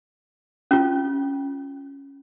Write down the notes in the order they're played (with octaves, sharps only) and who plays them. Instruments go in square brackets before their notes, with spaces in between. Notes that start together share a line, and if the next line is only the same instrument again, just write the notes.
[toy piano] C#4 F4